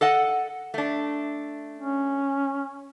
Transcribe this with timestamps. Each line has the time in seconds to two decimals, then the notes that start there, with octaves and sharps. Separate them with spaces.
0.01 A4 D#5 F#5
0.74 A3 D4
1.77 C#4